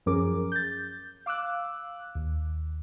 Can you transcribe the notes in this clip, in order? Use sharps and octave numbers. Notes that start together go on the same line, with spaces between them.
F#2 F3 C#4 G#4 A#4 D6
G6 A6
F5 D6 E6 F#6
D#2